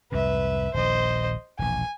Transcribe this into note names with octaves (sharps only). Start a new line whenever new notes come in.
C2 F2 G#2 B4 E5
D#1 A#1 C5 D#5
E1 A#1 G#5